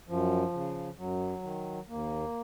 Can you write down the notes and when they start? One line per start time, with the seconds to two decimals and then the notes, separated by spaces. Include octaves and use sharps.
0.08 F#2 F3
0.53 C#3
0.98 F#2 F#3
1.43 D#3
1.88 D#2 A#3